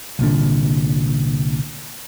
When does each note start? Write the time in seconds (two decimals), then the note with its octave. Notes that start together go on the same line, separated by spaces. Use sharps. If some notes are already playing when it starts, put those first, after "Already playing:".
0.19 C2 A#2 D3